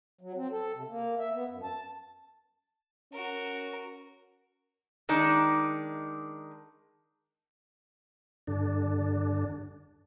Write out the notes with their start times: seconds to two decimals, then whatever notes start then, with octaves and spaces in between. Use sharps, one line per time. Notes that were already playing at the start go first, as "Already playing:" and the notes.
0.21 F#3
0.35 C4
0.51 A4
0.75 C3
0.89 A#3
1.19 E5
1.33 B3
1.48 F#2
1.63 A5
3.13 C#4 F#4 A#4
5.09 D#3 G#3 D4 D#4
8.47 G2 D3 D4